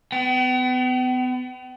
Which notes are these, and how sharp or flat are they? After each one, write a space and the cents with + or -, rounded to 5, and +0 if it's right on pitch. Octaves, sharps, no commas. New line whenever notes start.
B3 +35 G5 -45